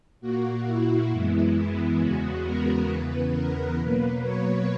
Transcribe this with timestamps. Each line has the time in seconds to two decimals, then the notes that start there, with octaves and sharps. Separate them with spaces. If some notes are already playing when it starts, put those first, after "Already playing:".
0.21 A#2 A#3 F#4
0.65 E4
1.10 F#2 E3 G#3 B3 E4
1.99 E2 C#3 G#3 B3 F#4
2.45 A#4
2.88 E2 C#3 E3 B3 B4
3.34 A#4
3.78 B2 F#3 A#3 B4
4.22 C#5